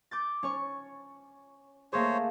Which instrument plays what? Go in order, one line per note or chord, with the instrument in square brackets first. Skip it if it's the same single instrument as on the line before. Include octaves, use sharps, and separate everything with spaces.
[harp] D6 G6 A6
C#4 C#5 C#6
[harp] A3 A#3 G#4 [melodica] C5 C#5